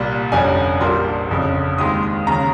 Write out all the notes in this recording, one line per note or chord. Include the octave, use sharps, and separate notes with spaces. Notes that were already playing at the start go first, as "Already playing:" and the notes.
Already playing: C2 A#2 G3
G1 F2 C3 G3 C#4 G#5
A#1 A#2 G3 A#3 C6
G1 F2 C#3
D#2 D#3 G#3 C4 D#6
D#6
D#2 C#3 A#5